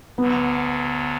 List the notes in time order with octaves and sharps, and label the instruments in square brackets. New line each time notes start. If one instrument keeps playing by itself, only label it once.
[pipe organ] D2 D3 F#3 [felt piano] B3